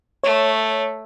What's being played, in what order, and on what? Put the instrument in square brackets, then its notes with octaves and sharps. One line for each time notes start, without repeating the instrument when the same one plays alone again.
[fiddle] A3 [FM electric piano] C#5